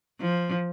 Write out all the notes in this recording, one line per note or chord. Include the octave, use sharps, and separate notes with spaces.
F3